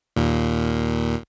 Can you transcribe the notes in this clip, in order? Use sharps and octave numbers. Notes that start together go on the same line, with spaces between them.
D#2 A#2